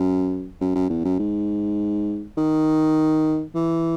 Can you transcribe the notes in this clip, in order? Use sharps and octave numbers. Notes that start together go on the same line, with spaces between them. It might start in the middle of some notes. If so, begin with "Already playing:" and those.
Already playing: F#2
F#2
F#2
E2
F#2
G#2
D#3
E3